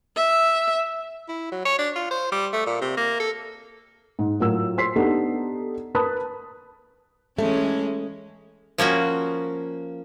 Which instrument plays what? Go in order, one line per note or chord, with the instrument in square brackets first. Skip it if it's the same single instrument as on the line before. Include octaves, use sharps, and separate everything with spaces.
[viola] E5
[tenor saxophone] E4
F#3
C#5
D4
F4
C5
G3
A3
A#2
C3
A#3
A4
[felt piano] G#2
A2 F#3 F4 A#4 E6
C5 C6 B6 C7
B3 D4 D#4 G4 A4 B4
A#4 B4 A5 B5 D#6 F#6
[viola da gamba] E3 G#3 C#4 [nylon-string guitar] A3
[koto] F3 A#3 C#4 F#4